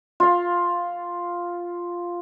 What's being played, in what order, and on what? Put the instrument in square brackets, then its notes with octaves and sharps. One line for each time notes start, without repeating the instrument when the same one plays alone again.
[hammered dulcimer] F4 F5